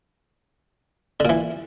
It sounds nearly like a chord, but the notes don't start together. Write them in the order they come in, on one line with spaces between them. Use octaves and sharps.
D3 A#2 E3